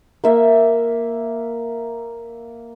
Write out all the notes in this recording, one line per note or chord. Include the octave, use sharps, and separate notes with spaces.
A#3 E5